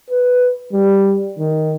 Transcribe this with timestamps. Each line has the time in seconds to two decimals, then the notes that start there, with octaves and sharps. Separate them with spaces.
0.10 B4
0.73 G3
1.39 D#3